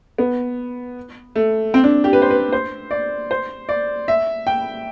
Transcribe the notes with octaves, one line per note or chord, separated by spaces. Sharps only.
B3
A3
C4
D4
G4
B4
C5
B4
C5
D5
C5
D5
E5
G5